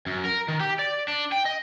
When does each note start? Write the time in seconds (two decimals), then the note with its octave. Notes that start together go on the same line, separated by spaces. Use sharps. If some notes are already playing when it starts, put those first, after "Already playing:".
0.06 F#2
0.25 A#4
0.48 D#3
0.60 G4
0.79 D5
1.08 D4
1.32 G5
1.45 D#5